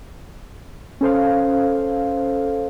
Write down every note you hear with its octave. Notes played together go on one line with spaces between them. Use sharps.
C#4 A4 C5 F5